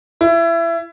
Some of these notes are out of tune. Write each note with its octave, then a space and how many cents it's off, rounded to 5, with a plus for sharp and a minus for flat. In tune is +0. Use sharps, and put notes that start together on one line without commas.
E4 +25